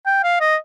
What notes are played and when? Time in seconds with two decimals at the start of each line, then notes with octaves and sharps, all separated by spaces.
0.06 G5
0.23 F5
0.40 D#5